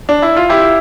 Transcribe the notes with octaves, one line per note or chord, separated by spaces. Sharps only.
D4
E4
F4
E4 G4